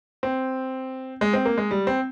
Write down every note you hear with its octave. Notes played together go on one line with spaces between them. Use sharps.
C4
G#3
C4
A#3
G#3
G3
C4